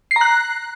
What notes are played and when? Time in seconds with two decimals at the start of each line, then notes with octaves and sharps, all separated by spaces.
0.11 C7
0.16 A#5
0.21 F#6